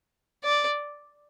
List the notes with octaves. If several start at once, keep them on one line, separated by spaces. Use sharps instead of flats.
D5